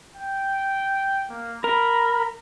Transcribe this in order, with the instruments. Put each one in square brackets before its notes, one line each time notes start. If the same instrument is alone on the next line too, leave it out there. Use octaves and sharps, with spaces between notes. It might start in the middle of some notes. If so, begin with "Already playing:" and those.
[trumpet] G5
A#3
[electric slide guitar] A#4 [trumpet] B5